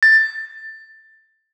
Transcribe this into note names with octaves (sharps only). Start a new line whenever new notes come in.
A6